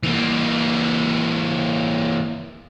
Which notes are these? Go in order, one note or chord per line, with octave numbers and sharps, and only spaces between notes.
E3 A#3